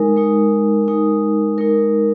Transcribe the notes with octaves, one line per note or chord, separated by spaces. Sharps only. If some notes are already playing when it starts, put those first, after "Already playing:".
Already playing: G#3 D#4 A#4
G#3 D#4
G#3 D#4 A#4
G#3 D#4 A#4